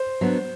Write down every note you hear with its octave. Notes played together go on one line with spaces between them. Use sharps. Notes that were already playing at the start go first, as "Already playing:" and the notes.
Already playing: C5
F#3 B3 D4